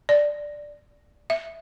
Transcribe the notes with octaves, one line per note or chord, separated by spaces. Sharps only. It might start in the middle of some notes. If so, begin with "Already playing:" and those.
D5
E5